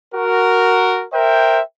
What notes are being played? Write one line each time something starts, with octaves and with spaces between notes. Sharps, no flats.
F#4 A#4
A#4 C5 E5 G5